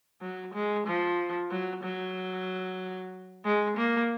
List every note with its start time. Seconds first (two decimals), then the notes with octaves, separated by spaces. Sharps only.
0.21 F#3
0.54 G#3
0.87 F3
1.50 F#3
1.83 F#3
3.45 G#3
3.77 A#3